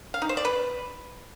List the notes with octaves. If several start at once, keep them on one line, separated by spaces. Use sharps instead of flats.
F5
D#4
C5
D5
B4